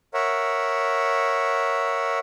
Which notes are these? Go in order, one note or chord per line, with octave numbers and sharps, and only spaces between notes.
A#4 C#5 E5 F#5